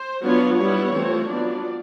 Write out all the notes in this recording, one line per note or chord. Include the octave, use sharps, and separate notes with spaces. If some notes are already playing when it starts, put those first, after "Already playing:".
Already playing: C5
F#3 B3 D4 F4 C#5
G3 B3 E4 C#5
E3 A3 C4 F4
F#3 B3 D4 F4 D5